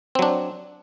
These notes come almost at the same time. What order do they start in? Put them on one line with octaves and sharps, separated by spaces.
C4 F#3 D4